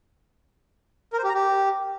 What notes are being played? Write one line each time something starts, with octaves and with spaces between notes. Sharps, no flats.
A#4
C5
G4
A#5
G4